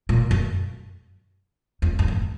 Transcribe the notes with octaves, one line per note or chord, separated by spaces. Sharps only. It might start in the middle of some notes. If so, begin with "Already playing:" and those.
A#2
F#2
F2
F#2
F2